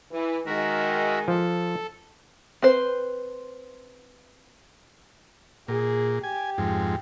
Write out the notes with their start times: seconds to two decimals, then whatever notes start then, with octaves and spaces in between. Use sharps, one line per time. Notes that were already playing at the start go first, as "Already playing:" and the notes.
0.12 E3
0.46 D#3 G#3 F#4 A#4 E5
1.28 F3 A4
2.62 C4 B4 C5
5.68 A#2 G#4
6.24 G4 G#5
6.58 F2 G#2